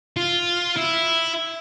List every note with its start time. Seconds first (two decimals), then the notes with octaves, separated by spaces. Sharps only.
0.17 F4
0.76 E4